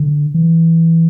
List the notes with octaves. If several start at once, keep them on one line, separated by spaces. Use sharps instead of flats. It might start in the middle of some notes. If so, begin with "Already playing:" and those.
Already playing: D3
E3